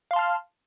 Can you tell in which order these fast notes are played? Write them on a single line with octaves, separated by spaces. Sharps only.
F5 C6 A5 F6